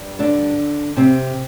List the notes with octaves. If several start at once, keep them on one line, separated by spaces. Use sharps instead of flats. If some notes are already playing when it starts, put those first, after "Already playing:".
Already playing: G2 G3
D3 D4
C3 C4